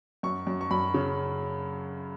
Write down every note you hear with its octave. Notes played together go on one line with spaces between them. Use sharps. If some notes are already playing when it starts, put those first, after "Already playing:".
F#2 C#6
F#2
C#6
F#2 B5
C#3